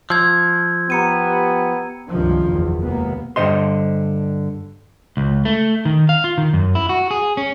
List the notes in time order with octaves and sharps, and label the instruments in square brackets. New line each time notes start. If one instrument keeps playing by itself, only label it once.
[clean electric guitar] F3 [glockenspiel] E6 G#6
[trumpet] B3 [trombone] G4 [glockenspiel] A#5 C#7 D#7
[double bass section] C#2 G2 C3 D#3 F3
F#1 B1 E2
D#2 C3 G#3 A#3 B3
[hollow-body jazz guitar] G2 D3 C5 D#5 C6
[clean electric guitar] C#2
A3
D#3
F5
F4
D#3
F#2
E4
F#4
G#4
C#4